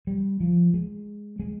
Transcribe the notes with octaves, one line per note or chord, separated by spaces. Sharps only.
G3
F3
G#3
G#3